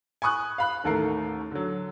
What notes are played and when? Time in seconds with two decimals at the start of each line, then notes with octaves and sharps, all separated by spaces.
0.22 G#5 B5 C#6 D#6 F#6
0.58 F5 B5 F#6
0.84 A1 D#2 A3 A4 A#4 C7
1.51 D3 F#3